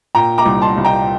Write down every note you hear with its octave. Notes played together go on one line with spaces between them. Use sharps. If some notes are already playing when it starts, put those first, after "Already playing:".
A#2 G5 A#5
A#5 D6
C2
A5 C6
C2
G5 A#5